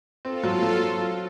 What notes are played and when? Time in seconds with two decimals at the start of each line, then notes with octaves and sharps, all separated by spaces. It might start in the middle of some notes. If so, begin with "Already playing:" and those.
0.25 C4 F4 A4
0.44 F#3
0.63 F#3